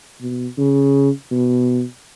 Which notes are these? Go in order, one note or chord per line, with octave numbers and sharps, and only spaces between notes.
B2
C#3
B2